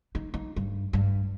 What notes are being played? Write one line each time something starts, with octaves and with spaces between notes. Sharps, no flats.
D#4
D#4
G2
G2